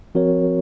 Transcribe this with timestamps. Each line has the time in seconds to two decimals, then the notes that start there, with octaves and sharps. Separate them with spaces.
0.15 F3 C4 F#4 A#4 C#5